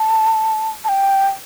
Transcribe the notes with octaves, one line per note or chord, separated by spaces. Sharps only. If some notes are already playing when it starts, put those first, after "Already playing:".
Already playing: A5
A5
G5